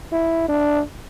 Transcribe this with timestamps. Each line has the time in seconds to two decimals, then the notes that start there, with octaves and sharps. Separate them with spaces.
0.12 E4
0.48 D4